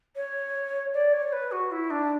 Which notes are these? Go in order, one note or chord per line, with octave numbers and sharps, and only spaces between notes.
C#5
D5
C#5
B4
F#4
E4
D4